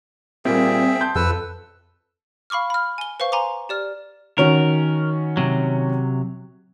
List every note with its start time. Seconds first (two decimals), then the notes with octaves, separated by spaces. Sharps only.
0.45 A#2 G3 A#3 C4 G#4 E5 G5
1.00 A5 C6 G6
1.15 F2 A4 B4 E6
2.50 F5 B5 C#6 D6 F6
2.70 B5 F6
2.98 G#5 G7
3.20 B4 C5 F5 C#6
3.32 G#5 A#5 C6 D6
3.69 G4 D5 F6
4.38 D#3 C#4 F#4 A#4
5.37 C3 F#3